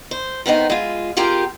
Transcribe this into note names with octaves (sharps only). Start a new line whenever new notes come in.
C5
D#3 B3 C4 D#4
G#3 F4
C4 F4 G4 G#4 A#4 G5